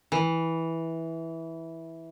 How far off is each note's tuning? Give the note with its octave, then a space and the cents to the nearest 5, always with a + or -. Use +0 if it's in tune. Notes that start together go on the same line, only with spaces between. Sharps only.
E3 -10